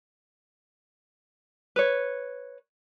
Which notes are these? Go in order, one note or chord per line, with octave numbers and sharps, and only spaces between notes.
B4 C#5